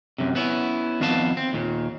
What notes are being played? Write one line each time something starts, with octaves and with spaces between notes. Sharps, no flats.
F#2 C3
B3 C#4 E4
F2 D#3 B3 B4 F5 A5
C4
D#2 A#2